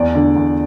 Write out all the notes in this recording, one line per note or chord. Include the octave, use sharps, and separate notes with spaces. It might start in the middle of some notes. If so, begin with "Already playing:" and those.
Already playing: E2 D5
D3
E2